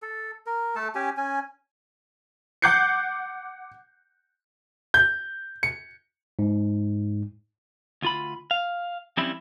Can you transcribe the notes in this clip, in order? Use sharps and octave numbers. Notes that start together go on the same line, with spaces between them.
A4
A#4
A3 A4 A5
C#4 G4 G#5
C#4 G#5
F#5 D6 F#6 G6 C7 C#7
G6
C#7
G#2
D2 F4 B5
F5
F3 G3 C4 C#4 E4